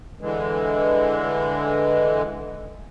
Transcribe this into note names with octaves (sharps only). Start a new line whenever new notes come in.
D3 E3 G#3